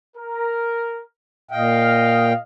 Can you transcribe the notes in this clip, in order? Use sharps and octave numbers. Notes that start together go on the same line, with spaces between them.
A#4
A#2 D#5 F5 G5